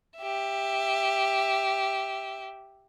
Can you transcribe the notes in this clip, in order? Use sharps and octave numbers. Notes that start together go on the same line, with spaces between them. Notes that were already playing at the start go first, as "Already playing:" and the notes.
G4 E5